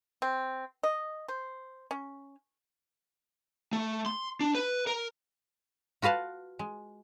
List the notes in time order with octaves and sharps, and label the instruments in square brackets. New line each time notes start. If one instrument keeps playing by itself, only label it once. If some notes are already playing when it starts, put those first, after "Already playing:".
[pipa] C4
D#5
C5
C#4
[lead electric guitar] A3
C6
D4
B4
A#4
[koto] F4 F#4 B4 F5 A5
G#3